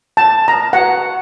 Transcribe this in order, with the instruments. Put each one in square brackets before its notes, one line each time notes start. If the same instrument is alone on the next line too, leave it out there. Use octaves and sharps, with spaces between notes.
[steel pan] A5
A#5
F#5